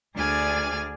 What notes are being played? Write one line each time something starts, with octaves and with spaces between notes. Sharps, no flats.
D2 D4 G#4 D5 G#5 F6